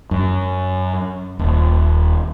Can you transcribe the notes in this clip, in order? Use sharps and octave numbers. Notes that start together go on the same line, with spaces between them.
F#2
D#1